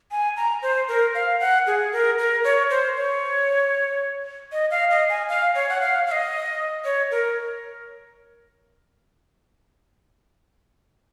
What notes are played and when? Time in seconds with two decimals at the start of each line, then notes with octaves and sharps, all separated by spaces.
0.11 G#5
0.37 A#5
0.62 C5
0.88 A#4
1.15 F5
1.40 F#5
1.67 G#4
1.93 A#4
2.18 A#4
2.44 C#5
2.70 C5
2.96 C#5
4.52 D#5
4.71 F5
4.91 D#5
5.09 G#5
5.29 F5
5.55 C#5
5.69 F#5
5.81 F5
6.07 F5
6.12 D#5
6.85 C#5
7.11 A#4